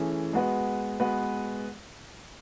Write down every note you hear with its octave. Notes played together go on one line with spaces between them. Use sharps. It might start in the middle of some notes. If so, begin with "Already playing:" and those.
Already playing: E3 A3 C#4 G#4
G#3 B3 F#4 B4
G#3 B3 F#4 B4